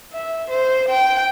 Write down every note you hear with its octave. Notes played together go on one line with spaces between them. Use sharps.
E5
C5
G5